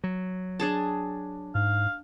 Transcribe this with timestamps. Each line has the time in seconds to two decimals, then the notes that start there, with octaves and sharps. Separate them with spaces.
0.04 F#3
0.60 D4 G#4 A5
1.55 G#2 F5